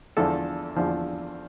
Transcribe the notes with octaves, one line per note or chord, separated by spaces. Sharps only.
E2 D3 F3 A4
E2 D3 F3